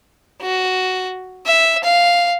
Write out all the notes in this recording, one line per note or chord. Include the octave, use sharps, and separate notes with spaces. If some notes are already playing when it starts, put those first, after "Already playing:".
F#4
E5
F5